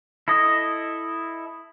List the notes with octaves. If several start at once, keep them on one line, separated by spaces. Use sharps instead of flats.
E4 A4 D#5